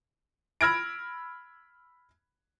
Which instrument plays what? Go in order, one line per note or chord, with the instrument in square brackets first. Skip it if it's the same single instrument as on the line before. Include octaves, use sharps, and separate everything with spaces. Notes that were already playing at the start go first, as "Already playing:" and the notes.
[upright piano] B5 E6 F6 G#6 A#6 D7